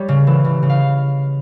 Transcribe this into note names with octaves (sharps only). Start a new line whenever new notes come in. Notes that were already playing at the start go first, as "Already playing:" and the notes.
Already playing: G3 G4 C#5
C#3
E3
C#3
C#3
F5